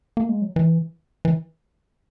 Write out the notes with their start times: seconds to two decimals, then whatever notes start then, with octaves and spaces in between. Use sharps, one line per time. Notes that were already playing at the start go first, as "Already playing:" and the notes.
0.17 A#3
0.29 G#3
0.42 F#3
0.56 E3
1.25 E3